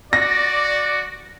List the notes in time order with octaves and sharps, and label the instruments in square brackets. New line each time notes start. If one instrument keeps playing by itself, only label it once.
[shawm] F#4 [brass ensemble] D5 [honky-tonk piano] A#6